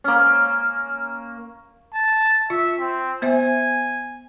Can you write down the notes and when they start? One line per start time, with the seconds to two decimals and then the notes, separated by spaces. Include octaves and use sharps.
0.04 A#3 C#4
1.94 A5
2.50 F4 E5
2.79 C4
3.22 B3 C5 E5 G#5